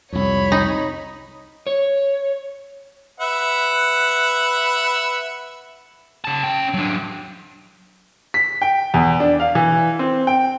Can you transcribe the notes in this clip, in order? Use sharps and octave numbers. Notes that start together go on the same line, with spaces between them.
C2 F2 C#5 B5
D#4
C#5
B4 E5 F#5
C#3 A5
C#4 G5
F#3 D4
B6
G5
E2
D4
F5
E3
C4
G5